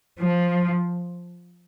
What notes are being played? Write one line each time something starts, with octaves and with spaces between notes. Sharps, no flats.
F3